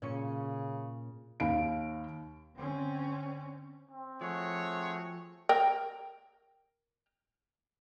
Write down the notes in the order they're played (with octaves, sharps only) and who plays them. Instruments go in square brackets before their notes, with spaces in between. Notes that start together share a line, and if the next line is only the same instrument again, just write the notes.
[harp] A#2 C#4 C#7 [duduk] C#3
[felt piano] D#2 F5 B5 D7
[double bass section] D3 C4 C#4
[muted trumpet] C4
[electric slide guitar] F3 [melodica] A3 F#4 G#4 [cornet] C#5
[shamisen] A#4 G5